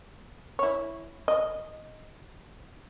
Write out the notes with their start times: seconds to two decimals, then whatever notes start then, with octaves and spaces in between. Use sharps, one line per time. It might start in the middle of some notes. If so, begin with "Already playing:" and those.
0.59 E4 C#5
1.28 D#5